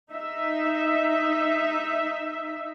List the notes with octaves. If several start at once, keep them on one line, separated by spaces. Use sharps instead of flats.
D#4 E5